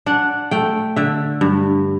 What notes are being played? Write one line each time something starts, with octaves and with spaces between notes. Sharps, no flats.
D4 F#5
A3 G5
D3 E5
G2